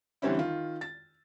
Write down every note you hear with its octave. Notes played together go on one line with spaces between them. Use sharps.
D3 E3 G3 C4 C#4 E4
D#3 F4
A6